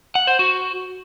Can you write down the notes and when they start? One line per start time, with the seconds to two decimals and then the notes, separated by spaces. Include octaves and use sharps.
0.15 F#5
0.27 C5
0.39 F#4